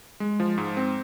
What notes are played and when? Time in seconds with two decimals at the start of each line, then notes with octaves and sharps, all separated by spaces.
0.20 G#3
0.40 F3
0.58 G#2
0.77 C4